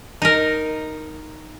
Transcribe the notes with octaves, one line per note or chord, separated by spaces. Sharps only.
D#4 A#4